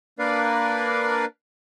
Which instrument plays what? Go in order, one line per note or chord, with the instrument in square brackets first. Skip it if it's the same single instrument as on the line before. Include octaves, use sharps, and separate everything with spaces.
[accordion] A#3 D4 A#4 B4 D5 F5